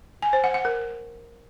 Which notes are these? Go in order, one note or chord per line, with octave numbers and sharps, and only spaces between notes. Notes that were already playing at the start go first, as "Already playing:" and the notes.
G#5
C5
F#5
F#5
A#4